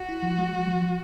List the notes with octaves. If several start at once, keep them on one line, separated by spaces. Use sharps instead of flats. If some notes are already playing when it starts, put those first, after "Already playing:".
Already playing: F#4
E4
F3
G#3
F3
F3
F3